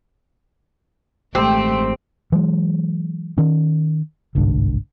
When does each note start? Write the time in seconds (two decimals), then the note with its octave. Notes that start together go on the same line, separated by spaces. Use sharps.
1.35 A1 G#3 A3 C4 G4 C6
2.32 E3 F#3 G#3
3.38 D#3 C#4
4.35 G1 C2 G#2 D3